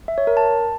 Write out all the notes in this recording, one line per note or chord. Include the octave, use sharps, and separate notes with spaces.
E5
C#5
A#4
A5